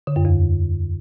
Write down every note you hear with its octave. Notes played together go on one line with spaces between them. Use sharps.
D3
F#2
E2